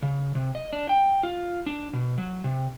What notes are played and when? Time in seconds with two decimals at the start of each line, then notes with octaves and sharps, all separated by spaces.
0.02 C#3
0.35 C3
0.55 D#5
0.73 D4
0.89 G5
1.23 F4
1.66 D4
1.93 B2
2.18 F#3
2.44 C3